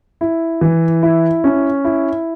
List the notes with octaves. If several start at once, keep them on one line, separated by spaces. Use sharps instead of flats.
E4
E3
E4
C#4
E4